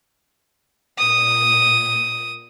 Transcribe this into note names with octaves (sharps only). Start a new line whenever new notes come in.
A#2 D#6